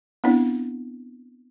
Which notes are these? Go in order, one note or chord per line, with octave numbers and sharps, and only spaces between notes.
B3 C4 D4 E4